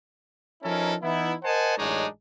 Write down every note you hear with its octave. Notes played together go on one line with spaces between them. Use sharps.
F3 C#4 D#4 E4 A4 A#4
E3 B3 D#4 E4
A#4 C5 D#5 F#5 G#5 A5
A1 F#2 G#3 D4 D#4 C#5